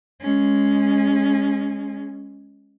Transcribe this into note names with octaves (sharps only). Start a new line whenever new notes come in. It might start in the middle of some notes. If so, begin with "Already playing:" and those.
G#3 C#4